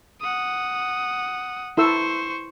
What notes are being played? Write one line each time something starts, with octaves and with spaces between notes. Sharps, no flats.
F#5 D#6
E4 A4 C5 C#6 E6